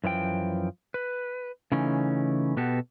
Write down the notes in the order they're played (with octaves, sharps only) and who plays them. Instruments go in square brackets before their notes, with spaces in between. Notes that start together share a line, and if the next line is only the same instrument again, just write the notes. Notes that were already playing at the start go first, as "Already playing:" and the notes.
[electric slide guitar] F#2 E3 F3 G5
B4
C#3 E3 A3 C#4 D#4
B2 B3 F#4 G4 A4